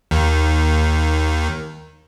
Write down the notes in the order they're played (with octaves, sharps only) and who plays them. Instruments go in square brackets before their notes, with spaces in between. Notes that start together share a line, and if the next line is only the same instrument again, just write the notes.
[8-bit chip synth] D#2 D#3